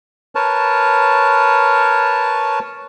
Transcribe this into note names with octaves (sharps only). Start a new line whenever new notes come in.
A#4 B4 C#5 A5